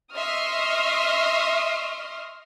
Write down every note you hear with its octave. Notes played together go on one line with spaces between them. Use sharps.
D#5 E5 C6 C#6 D#6 F6